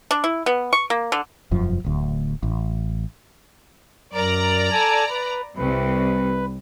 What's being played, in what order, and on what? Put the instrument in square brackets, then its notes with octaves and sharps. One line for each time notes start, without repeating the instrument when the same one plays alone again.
[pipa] D4
E4
B3
C#6
A#3
D3
[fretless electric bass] E1 F#2 F3
D1 D2
A1
[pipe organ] F#2 A#4 [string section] D5 A#5
[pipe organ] A4 G#5 A5
B4
[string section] C2 C3 [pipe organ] B4